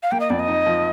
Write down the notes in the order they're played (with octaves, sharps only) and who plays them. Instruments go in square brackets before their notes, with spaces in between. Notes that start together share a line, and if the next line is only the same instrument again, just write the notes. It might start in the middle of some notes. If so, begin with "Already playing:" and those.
[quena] F5
[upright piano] A#3 [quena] G5
[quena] D#5
[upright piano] F2 [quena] D5
[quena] D#5
[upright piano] D#4
F3